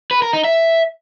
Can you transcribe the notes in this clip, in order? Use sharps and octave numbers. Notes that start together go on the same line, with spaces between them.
B4
A#4
D#4
E5